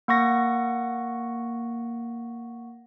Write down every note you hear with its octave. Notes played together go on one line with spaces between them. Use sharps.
A#3 F#5 C#6 A#6